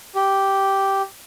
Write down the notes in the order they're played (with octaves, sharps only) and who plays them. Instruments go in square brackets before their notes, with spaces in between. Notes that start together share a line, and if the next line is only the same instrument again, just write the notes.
[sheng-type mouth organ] G4